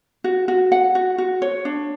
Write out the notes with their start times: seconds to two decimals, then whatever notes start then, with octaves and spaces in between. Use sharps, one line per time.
0.24 F#4
0.48 F#4
0.72 F#5
0.95 F#4
1.18 F#4
1.42 C#5
1.65 D4